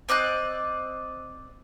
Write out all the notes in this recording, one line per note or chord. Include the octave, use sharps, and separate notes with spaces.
C4 D5 D#5 F#6